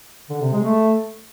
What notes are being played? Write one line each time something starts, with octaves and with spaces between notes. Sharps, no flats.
D3
C3
G#3
A3